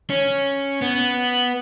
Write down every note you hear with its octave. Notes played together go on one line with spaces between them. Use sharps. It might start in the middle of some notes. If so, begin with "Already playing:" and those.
C#4
B3